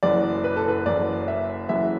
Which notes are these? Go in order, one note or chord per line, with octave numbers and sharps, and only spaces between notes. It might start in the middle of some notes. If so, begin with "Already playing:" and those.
F#1 F#2 E3 D5
B4
A4
B4
F#1 F#2 E3 D5
E5
F#1 F#2 E3 E5